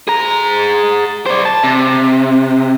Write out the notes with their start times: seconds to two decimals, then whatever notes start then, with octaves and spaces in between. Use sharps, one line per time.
0.08 G#4 A#5
1.26 C5 D5
1.45 A5
1.64 C3